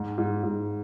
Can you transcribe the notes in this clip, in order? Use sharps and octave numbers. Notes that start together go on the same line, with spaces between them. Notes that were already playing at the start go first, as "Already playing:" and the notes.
Already playing: G#2
G#2
G#2